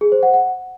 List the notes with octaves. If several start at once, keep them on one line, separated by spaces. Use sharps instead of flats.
G#4
C5
F#5
F#5